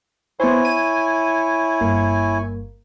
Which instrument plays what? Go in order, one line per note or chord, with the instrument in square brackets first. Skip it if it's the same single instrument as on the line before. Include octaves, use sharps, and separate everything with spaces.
[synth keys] B3 C5 [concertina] E4 C#5 G#5
[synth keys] D#7
G1 A#3